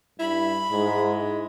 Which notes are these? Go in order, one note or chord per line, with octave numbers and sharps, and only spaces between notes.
G2 E4 B5
G#2 G#3 E4